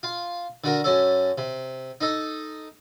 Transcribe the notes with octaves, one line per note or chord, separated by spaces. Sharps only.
F4
D3 F#4 A#4
F#2 C#4 A4
C3
D#4 A4